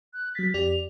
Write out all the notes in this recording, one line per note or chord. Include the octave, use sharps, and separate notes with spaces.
F#6
F#3 A6 B6
F2 G4 D5 F7